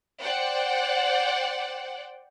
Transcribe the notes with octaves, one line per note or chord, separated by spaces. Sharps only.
C5 D5 F#5 G5